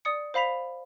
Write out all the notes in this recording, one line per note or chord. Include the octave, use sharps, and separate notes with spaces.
D5 D#6 C#7
C5 F5 B5 B6 F7